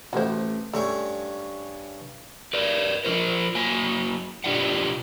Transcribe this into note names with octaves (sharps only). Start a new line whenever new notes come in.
A1 F#4 C5
G2 A3 C#4
A#4 B4 D5
F3 F4 A#4 C5
F#3 A#3 G#5
B2 D4 F4 G4 D5 F#5